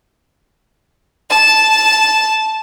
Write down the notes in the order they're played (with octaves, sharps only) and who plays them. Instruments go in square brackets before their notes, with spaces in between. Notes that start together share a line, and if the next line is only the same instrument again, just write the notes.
[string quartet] A5